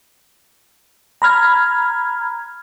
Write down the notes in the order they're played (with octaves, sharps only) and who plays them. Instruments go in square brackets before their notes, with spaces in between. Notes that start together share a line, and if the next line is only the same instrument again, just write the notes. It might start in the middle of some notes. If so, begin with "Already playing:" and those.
[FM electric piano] A#5 B5 F6 G#6